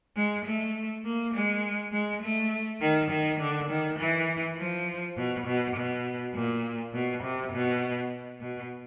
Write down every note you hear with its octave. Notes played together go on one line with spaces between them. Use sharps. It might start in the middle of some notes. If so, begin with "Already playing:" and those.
G#3
A3
A#3
G#3
G#3
A3
D#3
D#3
D3
D#3
E3
F3
B2
B2
B2
A#2
B2
C3
B2
B2